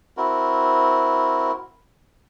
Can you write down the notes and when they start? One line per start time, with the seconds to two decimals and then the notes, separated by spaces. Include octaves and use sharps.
0.17 C4 E4 F#4 A#4